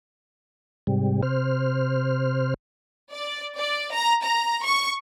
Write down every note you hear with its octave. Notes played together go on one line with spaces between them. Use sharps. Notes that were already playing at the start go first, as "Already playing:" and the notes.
G#2 C3 G3
C3 C5 F6
D5
D5
A#5
A#5
C#6